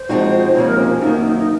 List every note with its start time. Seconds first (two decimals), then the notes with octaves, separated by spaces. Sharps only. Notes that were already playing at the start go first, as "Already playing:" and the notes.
Already playing: C5
0.09 F3 G#3 C4 D#4 F#4
0.55 F2 C3 F3 A#3 C#5
0.67 A#4
0.78 C#4
1.01 F#2 D#3 A#3 D#4
1.20 C#4
1.24 D#4
1.37 D#4